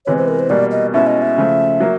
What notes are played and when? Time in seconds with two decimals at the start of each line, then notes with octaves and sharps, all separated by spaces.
0.06 C3 E3 G#3 B3 C#5
0.18 C5
0.28 A#4
0.39 C5
0.50 B2 G3 A#3 D5
0.71 D#5
0.93 B2 G#3 C#4 E4 E5
1.07 D#5
1.22 E5
1.38 C#3 F3 A3
1.80 F#3 A#3